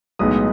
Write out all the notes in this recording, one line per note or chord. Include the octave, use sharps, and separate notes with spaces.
B1 A2 G#3 B3 D#4 D#6